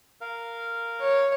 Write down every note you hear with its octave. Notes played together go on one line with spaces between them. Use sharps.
A#4 F5
C#5